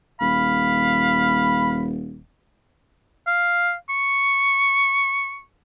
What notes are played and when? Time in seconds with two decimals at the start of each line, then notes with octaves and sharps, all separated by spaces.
0.21 D#1 F5 B5
3.27 F5
3.90 C#6